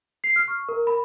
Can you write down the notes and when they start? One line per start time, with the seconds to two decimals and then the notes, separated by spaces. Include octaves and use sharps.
0.24 C7
0.36 F6
0.48 C#6
0.69 A#4
0.87 B5